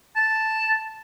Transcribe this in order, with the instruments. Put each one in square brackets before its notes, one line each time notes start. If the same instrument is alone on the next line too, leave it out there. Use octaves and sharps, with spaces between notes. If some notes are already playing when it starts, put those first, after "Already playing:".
[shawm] A5